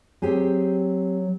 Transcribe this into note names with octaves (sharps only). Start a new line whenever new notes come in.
F#3 C4 G4 G#4